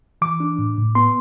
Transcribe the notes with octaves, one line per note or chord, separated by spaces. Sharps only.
E3 D6
D4
A2
A2
B3 C6